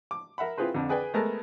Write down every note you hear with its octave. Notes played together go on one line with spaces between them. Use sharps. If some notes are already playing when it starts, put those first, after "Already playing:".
D6
A#4 E5 F#5 B5
C4 E4 F4 G#4 B4 C5
F2 D3
G#4 B4 D5 G5 G#5
G#3 A3 B3 A4 A#4 A5